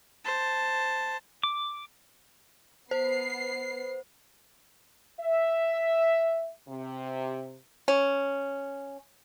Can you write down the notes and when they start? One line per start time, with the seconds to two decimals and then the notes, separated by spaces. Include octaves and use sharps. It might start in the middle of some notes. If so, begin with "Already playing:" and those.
0.24 C5 A5
1.43 D6
2.91 B3 C5 C7
5.21 E5
6.69 C3
7.88 C#4